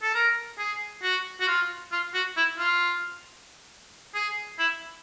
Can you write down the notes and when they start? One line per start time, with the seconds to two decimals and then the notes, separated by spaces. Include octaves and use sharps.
0.03 A4
0.15 A#4
0.58 G#4
1.03 F#4
1.41 F#4
1.48 F4
1.92 F4
2.14 F#4
2.37 E4
2.58 F4
4.14 G#4
4.59 E4